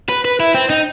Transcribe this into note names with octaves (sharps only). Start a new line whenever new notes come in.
B4
B4
E4
C4
D#4